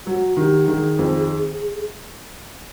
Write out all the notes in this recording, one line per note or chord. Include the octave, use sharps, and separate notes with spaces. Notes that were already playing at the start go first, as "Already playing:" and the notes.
F#3 F#4
D#3 G4
D#3 G#4
F2